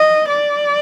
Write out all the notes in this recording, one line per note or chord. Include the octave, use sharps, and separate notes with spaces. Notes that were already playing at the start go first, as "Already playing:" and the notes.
Already playing: D#5
D5